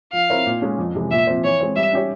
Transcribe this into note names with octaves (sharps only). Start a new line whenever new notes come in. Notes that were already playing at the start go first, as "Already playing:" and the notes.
F3 F5
C4 E4 A#4 C#5
A#2
G#3 C#4
F2
C3 E3 G#3
A#2 E5
F3 C4
E3 C#5
G#3 C4
G3 E5
C#4 G4 C#5